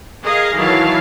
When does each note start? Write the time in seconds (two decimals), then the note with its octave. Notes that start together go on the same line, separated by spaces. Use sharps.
0.23 G#4 A#4 D#5 F5
0.56 D#3 E3 F#3 F5 A5